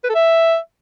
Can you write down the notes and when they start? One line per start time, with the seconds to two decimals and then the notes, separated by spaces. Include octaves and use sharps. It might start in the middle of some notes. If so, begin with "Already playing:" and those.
0.04 B4
0.09 A4
0.15 E5